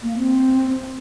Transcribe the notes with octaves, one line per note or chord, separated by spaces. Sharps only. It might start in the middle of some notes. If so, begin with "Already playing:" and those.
A#3
C4